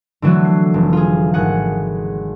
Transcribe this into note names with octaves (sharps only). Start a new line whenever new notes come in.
D3 E3 F#3 A3 F#4
C7
F1
F4 G#4
G#1 G#4 F#5